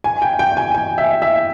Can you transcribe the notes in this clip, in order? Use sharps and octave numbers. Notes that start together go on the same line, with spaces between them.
G#5
G5
G5
G#5
G#5
E5
E5